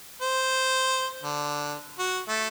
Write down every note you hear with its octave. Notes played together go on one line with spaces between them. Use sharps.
C5
D3
F#4
A3